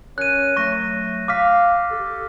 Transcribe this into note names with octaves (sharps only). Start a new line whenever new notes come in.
C#4 A#4 C#5 F#6 D#7
F#3 A3 C#6 A#6
F5 D6 F6 B6
G4 A4